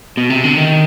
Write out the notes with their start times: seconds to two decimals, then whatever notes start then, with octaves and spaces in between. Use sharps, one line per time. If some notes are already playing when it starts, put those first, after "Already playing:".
0.17 B2
0.30 C3
0.44 D3
0.57 D#3